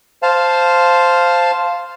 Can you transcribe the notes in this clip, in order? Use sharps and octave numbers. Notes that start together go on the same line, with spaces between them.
C5 F5 A5